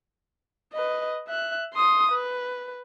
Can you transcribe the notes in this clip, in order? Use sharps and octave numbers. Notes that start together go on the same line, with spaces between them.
B4 D#5
E5 F#6
C6 D#6
B4